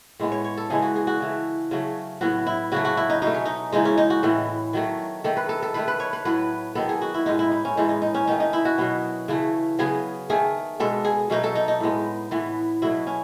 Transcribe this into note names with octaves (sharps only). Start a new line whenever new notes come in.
A2 G#3 B3
C#5
C#5
A4
C#3 E3 G#3 B3 G#4
F#4
G#4
F#4
C#3 E3 A3
C#3 F#3 A3
A2 F#3 B3 F#4
E4
C#3 F#3 A3 F#4
F#4
E4
D#4
B2 A3 D#4
C#4
D#4
C#3 E3 G#3 D#4
C#4
D#4
F#4
A2 E3 B3
D#3 F#3 A3
D#3 A3 A4
B4
A4
A4
D#3 A3 B4
B4
C#5
B4
A2 F#3 B3 B4
D#3 F#3 B3 A4
G#4
F#4
E4
A2 G#3 B3 D#4
E4
D#4
C#4
A2 E3 G#3 D#4
D#4
D#4
C#4
D#3 A3 D#4
D#4
E4
F#4
B2 F#3 B3
C#3 E3 A3
C#3 F#3 B3 G#4
D#3 A3 G#4
B2 G#3 B3 A4
G#4
B2 F#3 A3 D#4
A4
D#4
D#4
A2 G#3 B3
A2 E3 B3
B2 F#3 A3 E4
C#4